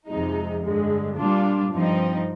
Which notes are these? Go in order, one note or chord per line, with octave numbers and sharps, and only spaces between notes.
F2 C3 F3 G#3 D#4
G2 D3 G#3
A#2 G3 D4 F4
G2 F3 C4 D#4